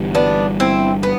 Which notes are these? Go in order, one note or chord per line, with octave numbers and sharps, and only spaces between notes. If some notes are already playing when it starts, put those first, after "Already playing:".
Already playing: G1 G2 E3 G3
B3 D4
C4 E4
B3